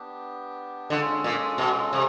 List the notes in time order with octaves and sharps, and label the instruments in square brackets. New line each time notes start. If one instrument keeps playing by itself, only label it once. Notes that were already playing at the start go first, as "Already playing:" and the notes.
Already playing: [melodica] B3 D4 G4
[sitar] D3 [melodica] G#3 C#4 F4 A4
[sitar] A#2
B2
C3